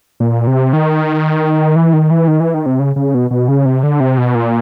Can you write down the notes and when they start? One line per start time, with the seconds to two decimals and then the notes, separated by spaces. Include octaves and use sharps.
0.20 A#2
0.47 C3
0.73 D#3
1.76 E3
1.93 D#3
2.11 E3
2.28 D#3
2.40 E3
2.54 D#3
2.66 C3
2.79 C#3
2.96 C#3
3.14 B2
3.31 B2
3.48 C#3
3.65 C3
3.83 D3
4.00 C3
4.18 B2
4.35 A#2